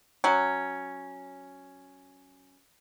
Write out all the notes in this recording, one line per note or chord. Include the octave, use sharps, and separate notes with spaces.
F#3 C#4